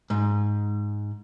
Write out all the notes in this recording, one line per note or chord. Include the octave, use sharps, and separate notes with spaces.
G#2